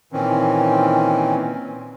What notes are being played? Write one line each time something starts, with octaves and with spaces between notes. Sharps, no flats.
A#2 D#3 E3 C4 C#4